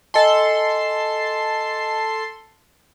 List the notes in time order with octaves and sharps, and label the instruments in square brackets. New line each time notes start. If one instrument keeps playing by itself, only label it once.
[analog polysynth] A4 C6 [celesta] D#5 G#5 A5